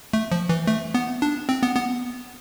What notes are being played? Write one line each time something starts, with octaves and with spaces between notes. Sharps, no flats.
A3
F3
E3
A3
B3
D4
C4
B3
B3